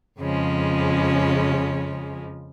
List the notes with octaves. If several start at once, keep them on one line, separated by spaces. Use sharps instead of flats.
F2 C#3 F3 G#3 C#4